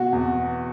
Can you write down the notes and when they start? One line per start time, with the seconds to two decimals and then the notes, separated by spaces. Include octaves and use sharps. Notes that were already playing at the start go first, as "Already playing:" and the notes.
Already playing: B2 F#4
0.13 E2